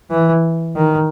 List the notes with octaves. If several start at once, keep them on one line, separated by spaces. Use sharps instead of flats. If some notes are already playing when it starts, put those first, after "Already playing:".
E3
D#3